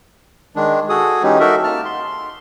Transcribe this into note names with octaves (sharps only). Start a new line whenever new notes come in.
D#3 G#3 D4
F#4 G#4 A4 D#6
E3 G#3 C#4 D#4 G4
D#4 F#4 A4 A#4 E5
A#3 A5 F6
C6